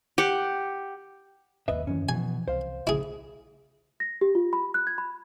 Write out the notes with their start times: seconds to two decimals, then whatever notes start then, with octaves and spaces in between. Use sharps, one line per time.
0.18 G4 F#5
1.68 G1 D#2 B4 D#5 E5
1.87 F#2 D#3 E3 C#4
2.09 B2 E3 F3 G#5
2.48 C2 C5 F5
2.87 A#1 C#3 E4 G#4
4.00 A#6
4.21 G4
4.35 F4
4.53 B5
4.74 F#6
4.87 G#6
4.98 B5